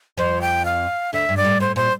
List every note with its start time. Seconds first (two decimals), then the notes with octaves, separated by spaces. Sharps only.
0.18 F2 F3 C5
0.41 G5
0.65 F5
1.13 D2 D3 E5
1.29 G2
1.37 D5
1.45 A2
1.60 A2 C5
1.76 A#2 C5